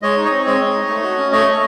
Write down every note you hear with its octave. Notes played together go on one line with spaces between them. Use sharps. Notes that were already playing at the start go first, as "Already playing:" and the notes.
G#3 C#5 D#5
D#4
C#5 D#5
C4
G#3 C#5 D#5
G#3
D#4
A3
F#4
C#4
A3 C#5 D#5
A3